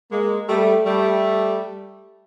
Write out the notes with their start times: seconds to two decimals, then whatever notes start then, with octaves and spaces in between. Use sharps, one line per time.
0.12 G#3 A#3
0.49 G3 A3
0.86 G3 A3